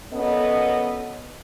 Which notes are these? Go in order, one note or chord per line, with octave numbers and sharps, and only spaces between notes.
F#2 B3 C#4 A4 D#5